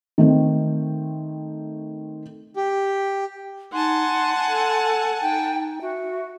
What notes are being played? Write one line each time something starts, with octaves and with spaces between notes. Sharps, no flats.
D#3 A3 C4
G4
D#4 F#5 G#5 A5 C6
A4
D#4 G5
F#4 E5